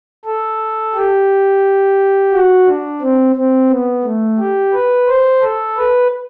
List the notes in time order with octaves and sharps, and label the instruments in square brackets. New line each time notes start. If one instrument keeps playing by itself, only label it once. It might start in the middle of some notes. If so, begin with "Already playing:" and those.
[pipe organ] A4
G4
F#4
D4
C4
C4
B3
A3
G4
B4
C5
A4
B4